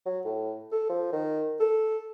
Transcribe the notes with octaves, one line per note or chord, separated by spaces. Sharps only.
F#3
A2
A4
F3
D#3
A4